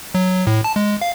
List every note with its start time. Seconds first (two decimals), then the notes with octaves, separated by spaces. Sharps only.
0.15 F#3
0.47 A2
0.64 A5
0.76 G#3
1.01 F5